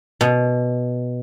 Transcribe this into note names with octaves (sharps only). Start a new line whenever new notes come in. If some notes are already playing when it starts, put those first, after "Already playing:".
B2